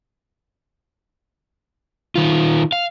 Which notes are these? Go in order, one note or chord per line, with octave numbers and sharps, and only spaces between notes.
D#3 F4
F5